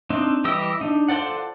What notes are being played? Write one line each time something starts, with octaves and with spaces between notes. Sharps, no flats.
C4 D4 D#4
E3 G3 G4 D#5 E6
D4 D#4
F4 A4 C5 D5 F#5